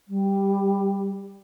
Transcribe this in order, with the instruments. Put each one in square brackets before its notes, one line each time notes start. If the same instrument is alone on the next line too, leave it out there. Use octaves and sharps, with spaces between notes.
[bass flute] G3